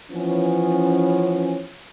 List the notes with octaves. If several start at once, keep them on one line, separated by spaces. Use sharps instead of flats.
E3 F3 B3 C#4